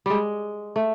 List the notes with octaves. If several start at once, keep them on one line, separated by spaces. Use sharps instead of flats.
G3 G#3
A3